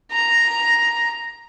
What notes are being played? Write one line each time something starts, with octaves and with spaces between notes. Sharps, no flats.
A#5